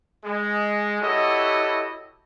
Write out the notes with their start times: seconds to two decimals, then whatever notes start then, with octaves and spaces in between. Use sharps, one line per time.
0.25 G#3
1.01 E4 F#4 G4 A4 C#5 D#5